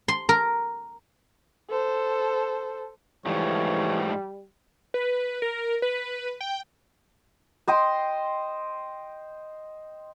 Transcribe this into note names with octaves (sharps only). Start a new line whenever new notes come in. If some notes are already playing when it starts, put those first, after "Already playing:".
C6
A#4
A4 C5
G#2 E3 F3 G3 A3 C#5
B4
A#4
B4
G5
C5 D#5 G5 C6